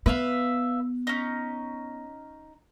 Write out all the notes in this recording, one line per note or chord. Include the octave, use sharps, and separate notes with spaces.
B3 B4 E5 F5
C#4 D#4